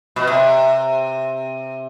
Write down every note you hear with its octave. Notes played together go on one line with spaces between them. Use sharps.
B2
C3